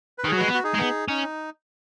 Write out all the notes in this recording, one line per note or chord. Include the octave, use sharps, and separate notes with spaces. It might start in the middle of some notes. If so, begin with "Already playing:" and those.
B4
D#3 G#4
F#3
G#3 F#4 B4
B3
F#4
D#4 G#4
G#3
B3
C#4 D#4